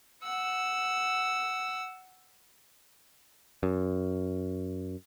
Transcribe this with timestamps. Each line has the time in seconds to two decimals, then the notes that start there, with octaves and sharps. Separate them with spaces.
0.23 F#5 E6
3.63 F#2